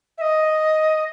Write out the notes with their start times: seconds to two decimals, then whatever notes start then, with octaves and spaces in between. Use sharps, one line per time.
0.18 E5
0.21 D#5